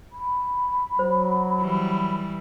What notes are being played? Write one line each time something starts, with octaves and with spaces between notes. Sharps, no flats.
B5
F#3 C5
E3 G3